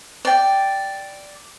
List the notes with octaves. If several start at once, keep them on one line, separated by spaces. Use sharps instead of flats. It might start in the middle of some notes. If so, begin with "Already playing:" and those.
D5 G5